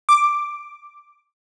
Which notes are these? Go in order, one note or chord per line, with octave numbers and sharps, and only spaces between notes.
D6